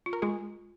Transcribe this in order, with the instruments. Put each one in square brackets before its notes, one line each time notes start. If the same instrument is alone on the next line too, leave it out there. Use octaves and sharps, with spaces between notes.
[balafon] F4
[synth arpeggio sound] A#4
[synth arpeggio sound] G#3 G#4 [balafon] F4